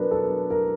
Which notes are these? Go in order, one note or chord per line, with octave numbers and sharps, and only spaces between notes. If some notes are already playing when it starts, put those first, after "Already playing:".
Already playing: B2 F#3 B3 D4 A#4 B4
A4
A#4